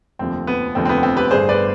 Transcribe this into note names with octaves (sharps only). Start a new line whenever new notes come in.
F1 D#2 D3 F3 C4
B3
F1 D#2 D3 F3 C4
C4
B3
C4
G4 B4
G1 G2 D3 G#4 C5
B4 D5